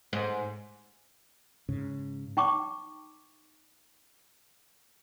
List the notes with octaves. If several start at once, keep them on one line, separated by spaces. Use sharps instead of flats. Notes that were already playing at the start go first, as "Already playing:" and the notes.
G#2
G#2 C#3
D#4 G5 C#6 D6